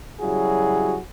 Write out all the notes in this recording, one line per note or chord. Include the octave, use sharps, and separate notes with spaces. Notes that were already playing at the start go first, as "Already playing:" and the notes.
C#3 F#3 G3 E4 F#4 G#4